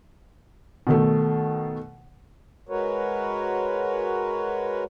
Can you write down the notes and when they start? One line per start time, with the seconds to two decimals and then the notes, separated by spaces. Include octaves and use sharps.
0.87 B2 D#3 A3
2.69 G#3 F#4 A#4 B4 C#5